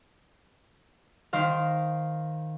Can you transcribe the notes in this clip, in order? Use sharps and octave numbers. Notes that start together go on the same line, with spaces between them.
D#3 C5 F5